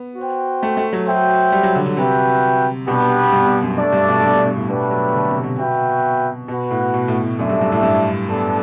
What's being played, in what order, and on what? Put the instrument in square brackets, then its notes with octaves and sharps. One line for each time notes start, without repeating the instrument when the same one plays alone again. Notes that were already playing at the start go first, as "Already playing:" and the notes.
Already playing: [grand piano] B3
[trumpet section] F#4 C5 G5
[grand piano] A3
A3
F#3
[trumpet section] F#4 C5 E5 G5
[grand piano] G3
F#3
D3
D3
[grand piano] C3 [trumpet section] F#4 B4 E5 G5
[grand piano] B2 [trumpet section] G3 B3 D4 G4 B4
[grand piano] G2
G2
F#2
[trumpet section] A3 D4 A4 D5
[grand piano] G2
B2
G2
G2
G2
A2
[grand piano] B2 [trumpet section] A3 D4 G4 B4
[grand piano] F#3
D3
C3
B2
[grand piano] B2 [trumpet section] F#4 B4 E5 G5
[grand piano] B2 [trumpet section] F#4 B4 F#5
[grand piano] A2
B2
A2
A2
[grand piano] F#2 [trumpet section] A3 D4 A4 E5
[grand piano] G2
G2
A2
G2
[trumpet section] B3 D4 A4